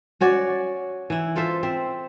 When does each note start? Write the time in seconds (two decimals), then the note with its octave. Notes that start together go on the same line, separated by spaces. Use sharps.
0.21 C#4 F#4 C#5 D5
1.10 E3 E4
1.36 F4 A4 C5 E5
1.63 C4 E5